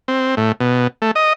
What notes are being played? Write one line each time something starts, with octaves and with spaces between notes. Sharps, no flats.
C4
A2
B2
A3
D#5